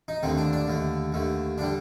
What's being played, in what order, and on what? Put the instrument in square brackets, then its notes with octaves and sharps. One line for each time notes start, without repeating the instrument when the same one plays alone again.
[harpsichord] D#4
D#2 D3 A3 C4
D4
D4
D#2 D3 A3
D#2 D3 A3
D3 G3 D4